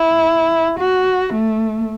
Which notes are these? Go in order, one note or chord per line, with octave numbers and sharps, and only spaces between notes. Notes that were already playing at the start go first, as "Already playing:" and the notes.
Already playing: E4
F#4
A3